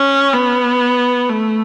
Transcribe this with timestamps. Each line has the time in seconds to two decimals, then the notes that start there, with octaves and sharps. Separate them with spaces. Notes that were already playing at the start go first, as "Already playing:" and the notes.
Already playing: C#4
0.33 B3
1.29 A3